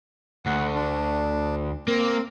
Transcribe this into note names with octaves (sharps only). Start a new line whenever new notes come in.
D2 F#5
D4
A#3 C4